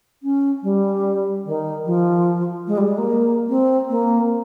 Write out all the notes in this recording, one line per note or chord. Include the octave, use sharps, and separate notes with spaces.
C#4
G3
D#3
F3
G#3
G3
G#3
A#3
C4
A#3